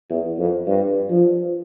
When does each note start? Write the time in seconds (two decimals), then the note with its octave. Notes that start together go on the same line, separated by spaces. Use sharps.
0.10 E2
0.39 F2
0.67 G2
1.10 F3